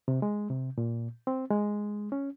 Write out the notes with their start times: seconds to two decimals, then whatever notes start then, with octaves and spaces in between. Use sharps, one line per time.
0.08 C3
0.22 G#3
0.50 C3
0.78 A#2
1.27 C4
1.51 G#3
2.12 C#4